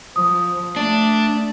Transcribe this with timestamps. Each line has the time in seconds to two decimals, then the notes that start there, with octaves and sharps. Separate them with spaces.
0.16 F3 D#6
0.76 A3 D4